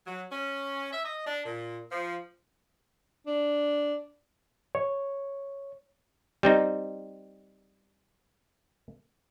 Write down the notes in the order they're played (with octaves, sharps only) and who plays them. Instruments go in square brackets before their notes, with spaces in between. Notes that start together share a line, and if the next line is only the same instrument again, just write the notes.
[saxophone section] F#3
C#4
E5
D#5
D4
A#2
F3
[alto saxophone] D4
[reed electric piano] C#5
[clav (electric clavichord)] G3 C4 D#4